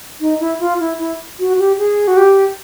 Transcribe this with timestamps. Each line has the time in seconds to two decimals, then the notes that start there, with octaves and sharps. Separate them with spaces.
0.21 D#4
0.40 E4
0.60 F4
0.80 E4
0.99 E4
1.39 F#4
1.59 G4
1.78 G#4
2.08 F#4
2.17 G4